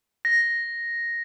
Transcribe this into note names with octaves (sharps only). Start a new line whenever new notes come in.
A#6